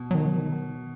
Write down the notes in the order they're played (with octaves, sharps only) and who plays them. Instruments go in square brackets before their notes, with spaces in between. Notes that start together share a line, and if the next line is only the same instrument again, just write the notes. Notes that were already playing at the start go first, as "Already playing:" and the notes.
Already playing: [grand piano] B2
[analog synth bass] F#3
D#3
F#3
D#3